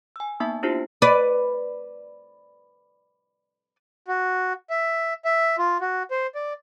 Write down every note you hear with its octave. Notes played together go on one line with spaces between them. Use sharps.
G#5 E6
A#3 B3 D#4 E5 A5
D4 E4 F4 G4 C5 A5
B4 D5
F#4
E5
E5
F4
F#4
C5
D5